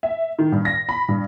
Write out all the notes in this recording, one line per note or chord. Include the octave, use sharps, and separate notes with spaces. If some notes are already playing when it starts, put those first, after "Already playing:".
E5
D#3
G2
A#6
B5
G2